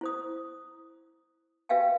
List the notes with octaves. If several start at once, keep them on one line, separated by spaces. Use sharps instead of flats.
E4 C5 D#6
F#4 B4 E5 F5 G5 G#5